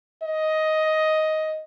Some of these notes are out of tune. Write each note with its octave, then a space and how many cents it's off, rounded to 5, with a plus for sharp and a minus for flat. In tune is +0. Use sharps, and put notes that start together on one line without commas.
D#5 +10